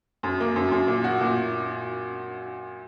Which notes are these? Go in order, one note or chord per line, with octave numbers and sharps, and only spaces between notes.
F#2
A#3
F#2
F#2
A#2
F#4
A#2